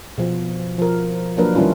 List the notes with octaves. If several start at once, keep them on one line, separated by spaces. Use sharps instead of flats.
B2 F3
F3 A#4
F3 F#3 A#3 D4 A#4 B4
D#3 G3 C#4 E4 F4